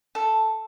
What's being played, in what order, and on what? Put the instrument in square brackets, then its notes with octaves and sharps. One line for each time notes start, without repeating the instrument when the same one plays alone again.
[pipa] A4